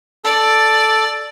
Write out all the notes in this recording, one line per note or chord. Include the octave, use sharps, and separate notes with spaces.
A4 D5